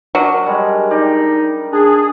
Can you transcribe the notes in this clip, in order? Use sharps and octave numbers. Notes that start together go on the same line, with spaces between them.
F#3 D4 A#4 G5
G3 G#3 G#5
D#4 G4 D5
D4 G#4